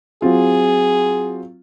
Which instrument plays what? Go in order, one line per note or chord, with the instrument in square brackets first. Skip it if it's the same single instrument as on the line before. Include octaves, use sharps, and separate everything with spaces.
[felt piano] F#3 C4 F4 [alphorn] G#4